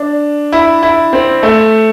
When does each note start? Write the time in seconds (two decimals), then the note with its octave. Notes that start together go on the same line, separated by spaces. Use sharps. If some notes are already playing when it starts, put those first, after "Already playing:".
Already playing: D4
0.52 E4
0.83 E4
1.13 C4
1.43 A3